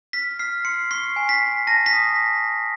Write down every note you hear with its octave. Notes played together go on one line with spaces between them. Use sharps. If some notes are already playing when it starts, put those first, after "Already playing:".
F6 B6
F6 C7
C6 C#7
C#6 C7
G#5
B6
G#5
A5 A#6
B6
D#6